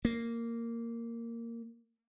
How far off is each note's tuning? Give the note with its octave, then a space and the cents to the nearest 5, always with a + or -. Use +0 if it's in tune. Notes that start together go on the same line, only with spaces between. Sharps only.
A#3 -10